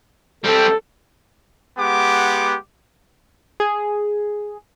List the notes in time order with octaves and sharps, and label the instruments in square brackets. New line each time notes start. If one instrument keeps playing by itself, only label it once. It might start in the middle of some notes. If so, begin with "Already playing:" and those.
[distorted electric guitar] G3 C4 [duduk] A4
[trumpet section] G#3 B3 G4 F#5 D6
[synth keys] G#4